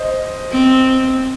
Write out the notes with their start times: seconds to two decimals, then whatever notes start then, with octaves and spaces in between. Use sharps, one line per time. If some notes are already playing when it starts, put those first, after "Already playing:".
Already playing: C5 D#5
0.52 C4